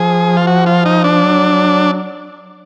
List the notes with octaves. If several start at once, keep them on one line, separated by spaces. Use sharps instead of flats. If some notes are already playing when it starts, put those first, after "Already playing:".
Already playing: F3 G#4
F4
F#4
F4
D#4
D4
F#3